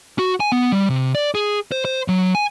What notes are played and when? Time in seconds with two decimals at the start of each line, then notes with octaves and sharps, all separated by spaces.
0.19 F#4
0.40 G#5
0.52 B3
0.72 G3
0.90 C3
1.15 D5
1.35 G#4
1.72 C5
1.85 C5
2.08 F#3
2.35 G#5